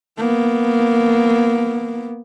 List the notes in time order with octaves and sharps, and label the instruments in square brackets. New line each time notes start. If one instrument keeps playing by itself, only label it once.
[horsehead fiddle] A#3 B3